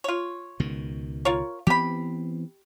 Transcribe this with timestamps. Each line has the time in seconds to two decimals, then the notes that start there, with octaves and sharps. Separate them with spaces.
0.04 F4 C#5
0.60 C#2 B2 D#3
1.25 F4 A#4 C#5
1.67 E3 B3 C4 G4 B5